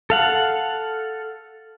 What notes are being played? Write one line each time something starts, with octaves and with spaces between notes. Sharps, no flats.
A4 F5 F#5